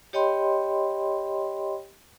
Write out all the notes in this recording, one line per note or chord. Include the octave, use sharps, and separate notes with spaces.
G4 C#5 D#5 G5 B5 C6